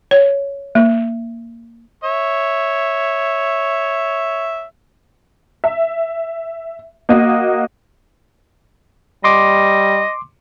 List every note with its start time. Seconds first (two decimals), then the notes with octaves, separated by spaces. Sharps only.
0.11 C#5
0.75 A#3
2.04 C#5 E5
5.64 E5
7.09 A#3 F#4 D#5
9.24 G3 D#5 C6 D6